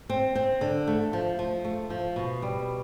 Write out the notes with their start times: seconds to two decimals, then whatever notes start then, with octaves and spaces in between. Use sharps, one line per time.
0.10 C4
0.35 C4
0.61 D3
0.87 A3
1.13 F3
1.39 F3
1.64 A3
1.90 F3
2.16 B2
2.42 G3